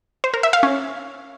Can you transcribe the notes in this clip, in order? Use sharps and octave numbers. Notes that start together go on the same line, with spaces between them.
C5
A#4
E5
F5
C#4